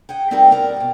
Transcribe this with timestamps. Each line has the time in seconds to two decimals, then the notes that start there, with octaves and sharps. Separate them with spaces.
0.09 G#4 F#5 G5
0.31 G3 C4 D#4 G4 A#4 F#5
0.50 A#4 D5 F#5
0.77 D#2 B2